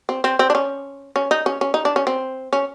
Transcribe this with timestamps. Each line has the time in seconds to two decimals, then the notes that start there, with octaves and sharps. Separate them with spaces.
0.09 C4
0.24 C4
0.39 C4
0.50 D4
0.55 C#4
1.16 C#4
1.31 D#4
1.46 C#4
1.61 C#4
1.74 D#4
1.85 D4
1.96 C#4
2.07 C4
2.53 C#4